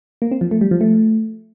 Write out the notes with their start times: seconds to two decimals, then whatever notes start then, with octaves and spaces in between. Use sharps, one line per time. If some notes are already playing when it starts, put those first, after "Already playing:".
0.22 A#3
0.31 C4
0.41 F3
0.51 A3
0.61 G3
0.71 F3
0.81 A3